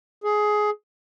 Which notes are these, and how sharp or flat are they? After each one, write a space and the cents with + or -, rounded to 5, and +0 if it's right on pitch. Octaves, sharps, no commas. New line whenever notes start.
G#4 +15